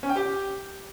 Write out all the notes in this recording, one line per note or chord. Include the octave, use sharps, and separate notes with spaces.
C#4
G5
G4